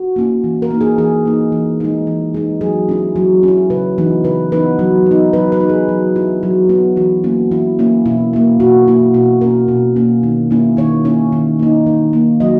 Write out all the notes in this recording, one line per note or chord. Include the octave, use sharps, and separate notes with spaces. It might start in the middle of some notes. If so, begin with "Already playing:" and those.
Already playing: F#4
A#3 C#4 E4
E3
A#4
A#3 D#4
G#4
E3 G#4
A#3 D#4
E3
G#3 D#4
E3
G#3 D#4
F#3 G#4
C#4 E4
F#3
C#4 E4
C#3 B4
E3 B3 D#4
C#3 B4
E3 B3 D#4 B4
F#3
B3 D#4
F#3 B4
B4
B3 D#4
G#4
F#3
B3 E4
F#3
B3 E4
E3 F#4
A#3 C#4 E4
E3 E4
A#3 C#4 E4
B2 E4
A#3 E4
B2 F#4
A#3 E4
B2 F#4
A#3 C#4 A#4
B2
A#3 C#4
D#3
A#3 C#4 E4
D#3 C#5
A#3 C#4 E4
D#3
A#3 D#4
D#3
A#3 D#4
F#3 D#5